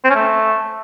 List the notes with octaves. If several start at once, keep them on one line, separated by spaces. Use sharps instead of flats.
C4
C#4
A3